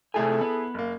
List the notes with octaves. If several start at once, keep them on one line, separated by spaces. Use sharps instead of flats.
C3 A3 E4 G#4 A4 G#5
B3
F#1 A#3